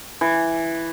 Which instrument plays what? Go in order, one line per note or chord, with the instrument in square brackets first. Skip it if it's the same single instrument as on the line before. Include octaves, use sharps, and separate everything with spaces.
[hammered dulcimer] E3